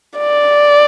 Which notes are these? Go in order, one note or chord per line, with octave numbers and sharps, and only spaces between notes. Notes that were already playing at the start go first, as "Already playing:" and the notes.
D5